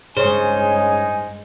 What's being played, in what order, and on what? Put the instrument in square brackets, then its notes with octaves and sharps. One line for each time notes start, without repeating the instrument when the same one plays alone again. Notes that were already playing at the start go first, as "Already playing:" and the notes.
[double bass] G2 G#3 [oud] C#3 [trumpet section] D#4 G#5 [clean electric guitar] C5